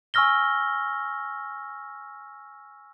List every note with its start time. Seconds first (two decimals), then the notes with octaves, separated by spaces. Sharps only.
0.14 G#5 C#6 E6 F6 A#6 G7